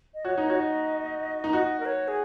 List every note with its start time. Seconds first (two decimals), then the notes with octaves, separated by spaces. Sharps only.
0.14 D#5
0.25 F#4 C#5
0.38 D#4
0.47 F#4 C#5
0.56 D#5
1.44 D#4
1.53 F#4 D#5
1.80 A#4
1.86 C#5
2.08 G#4